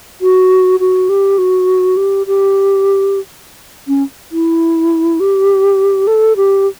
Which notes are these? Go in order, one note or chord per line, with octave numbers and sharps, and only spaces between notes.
F#4
F#4
G4
F#4
G4
G4
C#4
E4
G4
A4
G4